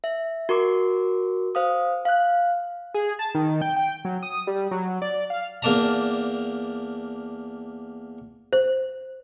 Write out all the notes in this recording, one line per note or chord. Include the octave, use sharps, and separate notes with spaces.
E5
F#4 A#4 C#6 D6
C5 F5 D#6
F5 F#6
G#4
A5
D#3
G5
G5
F#3
D#6
G3
F#3
D5
F5
E2 A#3 D4 D5 A5 A#5
C5